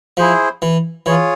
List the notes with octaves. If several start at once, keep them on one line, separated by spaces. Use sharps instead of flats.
F3 E4 G#4 C5
E3
E3 F4 G#4 C#5